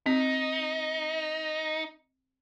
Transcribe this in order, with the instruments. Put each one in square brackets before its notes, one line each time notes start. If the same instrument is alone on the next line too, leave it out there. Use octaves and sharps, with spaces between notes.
[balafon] C4 [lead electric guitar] D#4